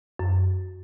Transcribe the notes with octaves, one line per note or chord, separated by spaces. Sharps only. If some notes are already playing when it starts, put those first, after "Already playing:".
F#2